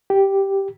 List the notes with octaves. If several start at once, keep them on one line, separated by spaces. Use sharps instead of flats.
G4